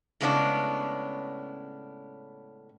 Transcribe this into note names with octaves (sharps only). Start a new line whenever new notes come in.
A2 C#3 G#3 B3 C#4 D4